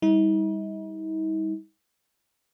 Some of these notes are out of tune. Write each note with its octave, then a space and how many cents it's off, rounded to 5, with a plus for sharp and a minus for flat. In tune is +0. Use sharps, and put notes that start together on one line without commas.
G3 +25 D#4 +45